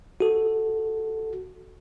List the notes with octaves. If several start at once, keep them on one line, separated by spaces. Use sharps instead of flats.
F#4 A4